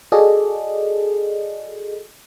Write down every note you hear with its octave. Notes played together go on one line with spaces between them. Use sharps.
F#4 G#4 A4 D5 D#5